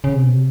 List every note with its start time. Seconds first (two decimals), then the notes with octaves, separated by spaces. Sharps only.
0.04 C#3
0.13 C3
0.23 B2
0.32 C3